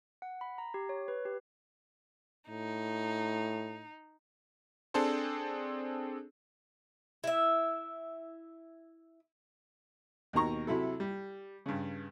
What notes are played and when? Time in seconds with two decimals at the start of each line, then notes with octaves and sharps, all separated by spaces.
0.22 F#5
0.41 B5
0.58 A#5
0.74 G4
0.89 C#5
1.08 B4
1.25 G4
2.50 A2 D#4
4.94 C4 D4 G#4 A4 C5
7.24 E4 E5
10.33 D#2 B2 D#3 A#5 C#6
10.67 C3 F#3 E4 A4
11.00 G3
11.66 G2 C#3